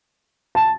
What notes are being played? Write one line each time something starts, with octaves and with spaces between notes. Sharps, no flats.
A5